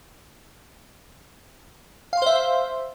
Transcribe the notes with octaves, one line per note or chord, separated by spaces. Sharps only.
C5 E5 F5 C6